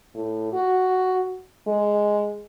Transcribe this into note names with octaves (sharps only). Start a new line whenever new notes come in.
A2
F#4
G#3